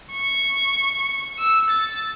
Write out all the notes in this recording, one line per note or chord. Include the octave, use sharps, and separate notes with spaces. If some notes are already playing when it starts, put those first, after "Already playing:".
C#6
E6
A6